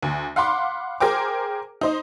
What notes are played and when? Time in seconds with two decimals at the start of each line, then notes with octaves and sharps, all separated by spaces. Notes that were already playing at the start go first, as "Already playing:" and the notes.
0.02 D2
0.36 F5 F#5 B5 C6 D6
1.00 G#4 A#4 C5 G5 D6
1.81 D#4 C5 D#5